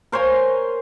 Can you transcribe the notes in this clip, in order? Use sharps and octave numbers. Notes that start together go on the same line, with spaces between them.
A#4 C5 C#5 G#5